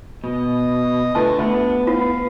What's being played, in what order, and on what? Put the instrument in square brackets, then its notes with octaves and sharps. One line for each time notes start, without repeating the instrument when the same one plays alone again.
[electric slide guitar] B2 [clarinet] D#5
[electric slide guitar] D3 [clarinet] A3 [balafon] F4 B4 [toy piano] A5
[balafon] A3 [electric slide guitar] B3 [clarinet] D4
[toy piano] F4 [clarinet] F5